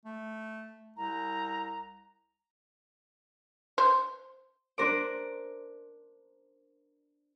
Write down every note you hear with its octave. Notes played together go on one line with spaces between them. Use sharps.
A3
C2 A#5
C5
D4 A#4 C5 D6